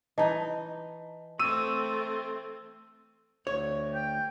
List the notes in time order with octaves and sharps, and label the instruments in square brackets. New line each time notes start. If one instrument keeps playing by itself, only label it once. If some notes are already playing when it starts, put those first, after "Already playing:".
[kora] E3 D#4 [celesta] D#5 A5
[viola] A3 C4 [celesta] C#6 [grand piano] E6 D#7
[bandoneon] D2 [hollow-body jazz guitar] C#5
[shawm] G5